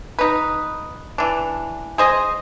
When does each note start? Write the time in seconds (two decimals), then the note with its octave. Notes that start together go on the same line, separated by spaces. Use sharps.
0.19 D#4 B4
1.18 E3 D4
1.98 G#4 C5 D#5